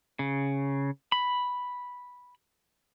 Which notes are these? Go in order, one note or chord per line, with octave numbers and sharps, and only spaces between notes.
C#3
B5